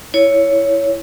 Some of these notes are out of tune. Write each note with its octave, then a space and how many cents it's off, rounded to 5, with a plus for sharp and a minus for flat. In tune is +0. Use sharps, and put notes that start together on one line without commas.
E4 +0 C#5 +10